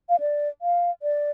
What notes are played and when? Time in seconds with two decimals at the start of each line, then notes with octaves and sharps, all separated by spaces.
0.09 F5
0.20 D5
0.62 F5
1.02 D5